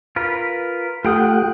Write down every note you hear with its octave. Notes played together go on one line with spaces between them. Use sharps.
F4 A#4 B4
A3 F4 G4 F#5 G5 D#6